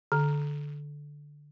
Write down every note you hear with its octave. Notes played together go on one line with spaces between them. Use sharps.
D3